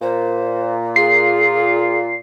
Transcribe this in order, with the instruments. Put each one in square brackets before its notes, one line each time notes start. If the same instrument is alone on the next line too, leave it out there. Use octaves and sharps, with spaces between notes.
[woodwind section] A#2 [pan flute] C5
[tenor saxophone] F4 [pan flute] G#4 [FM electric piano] C7